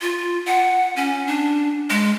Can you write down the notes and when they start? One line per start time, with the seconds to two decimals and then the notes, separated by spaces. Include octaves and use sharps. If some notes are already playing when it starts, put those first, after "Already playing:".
0.01 F4
0.47 F#5
0.96 C#4
1.27 D4
1.90 G#3